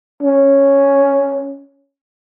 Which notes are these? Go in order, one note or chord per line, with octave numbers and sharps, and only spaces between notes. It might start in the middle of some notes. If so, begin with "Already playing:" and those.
C#4